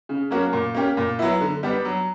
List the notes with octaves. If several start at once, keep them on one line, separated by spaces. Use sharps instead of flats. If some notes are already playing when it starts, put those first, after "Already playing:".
C#3
F#3 A#3 C#4 F#4
A#2
A#3 C#4 G4
A#2
F#3 B3 E4
D3
G3 B3 D4
F#3